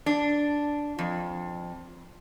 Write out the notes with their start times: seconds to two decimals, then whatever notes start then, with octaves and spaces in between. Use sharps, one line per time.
0.06 D4
0.99 F2